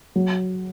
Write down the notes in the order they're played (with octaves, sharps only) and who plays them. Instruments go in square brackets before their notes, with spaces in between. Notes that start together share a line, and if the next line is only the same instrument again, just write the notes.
[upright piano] F#3